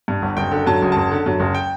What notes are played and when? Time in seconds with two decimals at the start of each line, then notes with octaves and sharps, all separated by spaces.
0.08 G2
0.22 G1
0.37 F#1 G5
0.51 D3
0.67 F#2 A5
0.82 F#1
0.92 F#1 A5
1.11 D3
1.26 F#2
1.40 F#1
1.55 G5